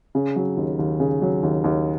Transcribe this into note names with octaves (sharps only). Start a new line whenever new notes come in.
C#3
F#3
D#2
D#2
C#3
F#3
D#2
D#2